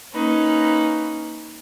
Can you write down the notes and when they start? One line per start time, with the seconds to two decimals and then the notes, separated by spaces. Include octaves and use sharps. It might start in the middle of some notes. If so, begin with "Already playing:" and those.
0.13 A#3 C#4 D#4 B4